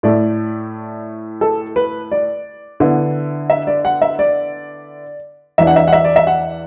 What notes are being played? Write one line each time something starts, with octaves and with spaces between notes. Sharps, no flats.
A2 A3 E4 D5
A4
B4
D5
D3 B3 E4
E5
D5
F#5
E5
D5
E2 E3 D4 E5
F#5
E5
F#5
E5
D5
E5
F#5